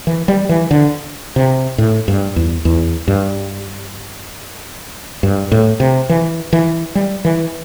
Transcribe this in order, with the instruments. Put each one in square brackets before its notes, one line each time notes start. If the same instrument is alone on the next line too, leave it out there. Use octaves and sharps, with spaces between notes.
[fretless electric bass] E3
G3
E3
D3
C3
A2
G2
E2
E2
G2
G2
A2
C3
E3
E3
G3
E3